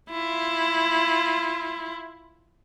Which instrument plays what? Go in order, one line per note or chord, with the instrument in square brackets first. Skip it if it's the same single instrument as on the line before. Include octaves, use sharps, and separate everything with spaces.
[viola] E4 F4